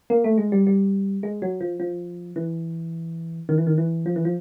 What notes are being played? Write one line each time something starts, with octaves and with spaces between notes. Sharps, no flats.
A#3
A3
G#3
G3
G3
G#3
F#3
F3
F3
E3
D#3
E3
D#3
E3
F3
E3
F3